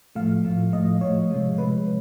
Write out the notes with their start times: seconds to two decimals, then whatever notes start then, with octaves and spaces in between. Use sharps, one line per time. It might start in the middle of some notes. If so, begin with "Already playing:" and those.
0.15 A2 F3 A3 F5
0.44 A2 F3 A3
0.72 A2 F3 A3 D#5
1.01 A2 F3 A3 C#5
1.30 C3 F3 G#3
1.58 C3 F3 G#3 B4